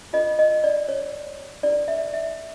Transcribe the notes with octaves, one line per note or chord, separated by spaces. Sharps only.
F4 A4 C5 D#5
D#5
D5
C#5
E4 G4 B4 D5
E5
E5